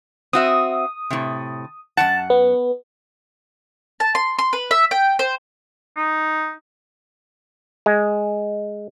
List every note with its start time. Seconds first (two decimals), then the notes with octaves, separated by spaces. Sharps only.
0.33 C4 F#4 E5 D#6
1.10 A2 C3
1.97 F#2 E3 F#5 A5
2.30 B3
4.00 A5
4.15 C6
4.39 C6
4.53 B4
4.71 E5
4.91 G5
5.19 C5
5.97 D#4
7.86 G#3